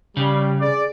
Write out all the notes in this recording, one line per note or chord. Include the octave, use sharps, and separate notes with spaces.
C#3 G3
G#4 D5